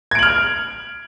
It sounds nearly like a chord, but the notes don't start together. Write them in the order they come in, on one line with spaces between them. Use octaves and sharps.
G#6 D7 F#7 F6